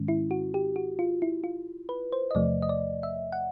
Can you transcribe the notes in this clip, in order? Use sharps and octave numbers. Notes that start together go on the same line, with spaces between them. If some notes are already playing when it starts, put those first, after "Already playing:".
Already playing: G#2 D#3 G#3 C#4
E4
F#4
G4
F#4
F4
E4
F4
B4
C5
D#5
E2 C3 F3 A3 D5
D#5
D5
E5
F#5